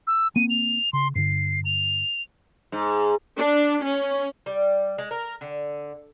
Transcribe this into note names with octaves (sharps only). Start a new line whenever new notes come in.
E6
A#3 C4 D#7
F7
C#3 C6
G2 D3 C7
F7
G#2
D4
C#4
G3
G#3
A#4
D3